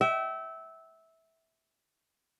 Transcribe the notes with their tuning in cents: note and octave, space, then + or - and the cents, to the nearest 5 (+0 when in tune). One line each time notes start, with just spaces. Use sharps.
E5 -15 G5 -40